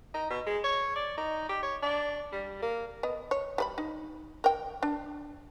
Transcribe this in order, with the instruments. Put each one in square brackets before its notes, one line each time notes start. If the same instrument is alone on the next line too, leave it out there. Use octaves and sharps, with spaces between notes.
[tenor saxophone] D#4
B2
G#3
C#5
D5
D#4
G4
C#5
D4
G3
A#3
[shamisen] B3 D#5
C#5
G3 B4 B5
D#4
A#4 G5
D4